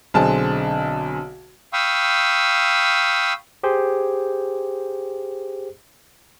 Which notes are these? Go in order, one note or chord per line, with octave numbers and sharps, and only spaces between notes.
B1 D3 C4 G#4 A5
F5 G5 B5 C#6 D#6 E6
G4 G#4 C5